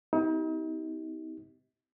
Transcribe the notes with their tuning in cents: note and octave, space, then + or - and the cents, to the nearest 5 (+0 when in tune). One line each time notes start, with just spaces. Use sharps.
C4 -45 D#4 +40 G4 -20